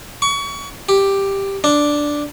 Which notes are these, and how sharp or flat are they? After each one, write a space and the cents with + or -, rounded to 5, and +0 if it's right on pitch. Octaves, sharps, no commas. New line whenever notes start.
C#6 +30
G4 +5
D4 +0